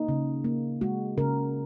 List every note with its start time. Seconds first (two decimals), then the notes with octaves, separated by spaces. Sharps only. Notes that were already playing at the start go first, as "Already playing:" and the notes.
Already playing: A#3 D#4
0.08 C#3
0.44 A#3
0.81 G#3 F#4
1.18 C#3 A#4